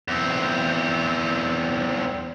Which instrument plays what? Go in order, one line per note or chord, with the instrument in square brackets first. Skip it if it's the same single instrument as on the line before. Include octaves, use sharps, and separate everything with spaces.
[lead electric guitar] E2 C4